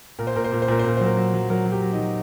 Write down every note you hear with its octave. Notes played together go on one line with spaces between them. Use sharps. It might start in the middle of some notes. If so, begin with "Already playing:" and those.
A#2 A#4
C5
A#2 A#4
C5
A#2 A#4
C5
A#2 A#4
C5
A#2 A#4
F#3 C5
A#4
F#3
F#3
F#3 A#4
F#3
G4
F#3
D#4
F#3